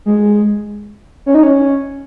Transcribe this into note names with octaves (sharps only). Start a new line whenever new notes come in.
G#3
C#4
D#4
C#4